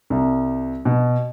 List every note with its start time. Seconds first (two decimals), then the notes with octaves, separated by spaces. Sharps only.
0.10 C2
0.85 B2